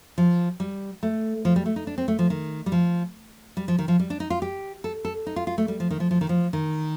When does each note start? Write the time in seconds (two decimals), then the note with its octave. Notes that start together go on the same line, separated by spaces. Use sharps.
0.18 F3
0.60 G3
1.03 A3
1.45 F3
1.56 G3
1.66 A3
1.76 D#4
1.87 D4
1.98 C4
2.08 A3
2.19 F3
2.30 D#3
2.66 G3
2.72 F3
3.57 G3
3.68 F3
3.79 D#3
3.88 F3
3.99 G3
4.10 D4
4.20 D#4
4.30 F4
4.42 G4
4.84 A4
5.05 A4
5.27 D#4
5.36 F4
5.47 F4
5.58 A3
5.68 G3
5.80 F3
5.91 D#3
6.00 F3
6.11 F3
6.21 D#3
6.29 F3
6.53 D#3